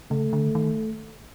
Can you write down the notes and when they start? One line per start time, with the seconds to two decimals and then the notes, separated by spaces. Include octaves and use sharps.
0.11 C#3 A3
0.33 D3
0.55 D#3